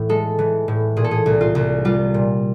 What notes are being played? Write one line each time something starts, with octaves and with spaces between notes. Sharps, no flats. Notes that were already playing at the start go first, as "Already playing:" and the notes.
Already playing: A2 E3
G#3 A4
E3
A2
A#2 G#4
A4
G#4
C2
F4
C2
G3 F4
A#2